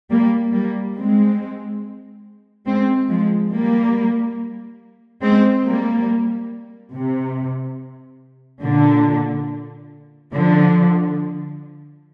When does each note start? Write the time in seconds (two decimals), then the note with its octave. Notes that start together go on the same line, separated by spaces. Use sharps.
0.10 G3 A#3
0.53 G3 A#3
0.96 G#3 C4
2.66 G#3 C4
3.09 F3 G#3
3.51 G3 A#3
5.22 G#3 C4
5.65 G3 A#3
6.93 C3
8.63 A#2 D3
10.34 D3 F3